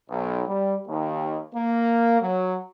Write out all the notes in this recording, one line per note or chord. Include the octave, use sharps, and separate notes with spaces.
B1
G3
D#2
A#3
F#3